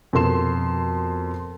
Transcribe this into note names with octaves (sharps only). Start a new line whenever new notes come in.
F2 B2 A#4 C6 E7